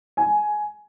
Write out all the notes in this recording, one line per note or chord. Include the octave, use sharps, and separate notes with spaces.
G#5